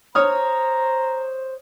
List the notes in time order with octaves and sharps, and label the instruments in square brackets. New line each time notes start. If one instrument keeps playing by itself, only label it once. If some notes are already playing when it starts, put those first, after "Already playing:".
[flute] C5 [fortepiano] C#5 D#6 F6 [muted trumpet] A#5